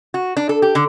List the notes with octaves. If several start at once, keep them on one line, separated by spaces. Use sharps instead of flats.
F#4
D4
A4
G4
D3